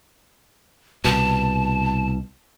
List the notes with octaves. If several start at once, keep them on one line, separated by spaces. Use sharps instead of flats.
C2 B2 A5